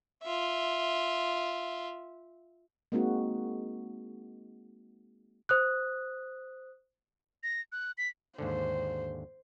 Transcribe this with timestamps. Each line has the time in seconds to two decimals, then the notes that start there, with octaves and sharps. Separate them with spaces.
0.23 F4 E5
2.92 G#3 A#3 C4 D#4 F#4
5.49 C5 D#6 F#6
7.43 A#6
7.72 F#6
7.98 B6
8.38 D#2 G#2 D3 C5